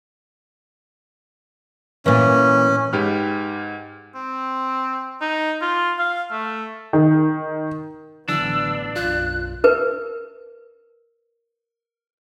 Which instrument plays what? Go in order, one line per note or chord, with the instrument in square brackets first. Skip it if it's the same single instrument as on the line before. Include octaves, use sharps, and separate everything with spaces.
[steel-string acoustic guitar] A#2 E3 [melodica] C#4
[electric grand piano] G#2 G4 B4 F6
[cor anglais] C4
D#4
F4
F5
A3
[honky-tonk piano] D#3
[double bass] A1 B3 [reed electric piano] D3 E3 F#3 [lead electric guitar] D4 [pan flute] E6
[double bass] F#1 B1 [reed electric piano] F4 [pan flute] F#6
[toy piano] A#4 B4